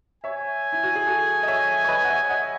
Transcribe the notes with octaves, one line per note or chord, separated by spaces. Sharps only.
C#5 E5 G#5
E4
F#4
G#4
F#4 A4
D#5
C#5 E5
C#5
B4 D#5
F#5
C#5 E5
D#5 F#5